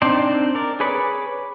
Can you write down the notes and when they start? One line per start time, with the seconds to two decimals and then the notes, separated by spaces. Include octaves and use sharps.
0.02 C4 D4 D#4 C5 D5
0.55 A#4 D5
0.80 G#4 B4 C#5 B5 D6